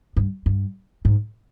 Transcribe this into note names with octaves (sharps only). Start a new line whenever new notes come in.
G2
G2
G#2